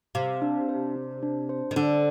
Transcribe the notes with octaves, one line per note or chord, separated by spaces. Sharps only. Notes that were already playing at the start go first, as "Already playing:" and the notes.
C3 F5
D4
C5
D4
D4
C5
D#3
D3 D4